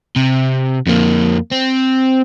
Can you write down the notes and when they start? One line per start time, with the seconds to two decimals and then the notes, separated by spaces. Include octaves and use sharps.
0.16 C3
0.87 F2 A#3
1.51 C4